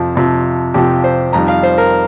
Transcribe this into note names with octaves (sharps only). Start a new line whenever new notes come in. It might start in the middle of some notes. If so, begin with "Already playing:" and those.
Already playing: F2 C3 F3
F2 C3 F3
F2 C3 F3 G4
C5
F2 D#3 G3 A#5
F5
C5
A#4